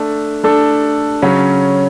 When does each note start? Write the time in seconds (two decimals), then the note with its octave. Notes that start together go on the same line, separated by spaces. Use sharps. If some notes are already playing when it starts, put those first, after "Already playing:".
Already playing: A3 D4 A4
0.44 A3 D4 A4
1.22 C#3 F#3 C#4